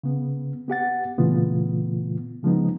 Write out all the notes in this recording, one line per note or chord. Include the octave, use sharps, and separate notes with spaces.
C#3 B3
B3 G4 F#5 A6
A#2 C#3 E3 A3 B3 F4
C#3 F3 G#3 B3 D#4